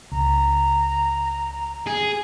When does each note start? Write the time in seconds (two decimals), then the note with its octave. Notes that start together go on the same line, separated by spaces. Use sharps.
0.12 C#2 A#5
1.86 G#4